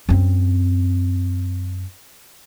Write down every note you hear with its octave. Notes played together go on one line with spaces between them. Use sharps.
F#2 C4